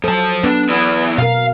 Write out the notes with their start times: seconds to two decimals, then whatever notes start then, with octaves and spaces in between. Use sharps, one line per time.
0.04 F3 F#3 A4 A5
0.43 B3 D4 B4
0.69 E2 E4
1.18 B2 A#4 F5